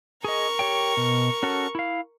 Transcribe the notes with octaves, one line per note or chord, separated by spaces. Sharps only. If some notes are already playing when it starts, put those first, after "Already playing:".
G#4 A#4 D#5 C#6
G4 C#5 G5
B2
C#4 F#4 A4
E4 F5